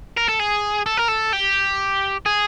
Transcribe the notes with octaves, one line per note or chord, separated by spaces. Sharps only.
A#4
A4
G#4
A4
A#4
A4
G4
G#4